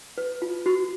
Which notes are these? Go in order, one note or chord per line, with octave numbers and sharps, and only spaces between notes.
B4
F4
F#4